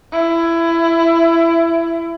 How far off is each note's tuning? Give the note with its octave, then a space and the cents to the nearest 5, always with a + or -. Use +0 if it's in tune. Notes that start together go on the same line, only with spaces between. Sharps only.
E4 +20